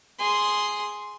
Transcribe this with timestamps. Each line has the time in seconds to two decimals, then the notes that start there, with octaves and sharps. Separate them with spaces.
0.19 G#4 C6